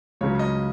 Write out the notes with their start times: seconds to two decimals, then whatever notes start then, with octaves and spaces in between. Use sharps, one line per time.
0.21 C#2 C#3 F#3 C#5
0.39 D#5